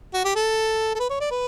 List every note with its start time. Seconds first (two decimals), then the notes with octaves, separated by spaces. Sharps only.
0.14 F#4
0.25 G4
0.35 A4
0.95 A4
1.00 B4
1.10 C#5
1.21 D5
1.31 B4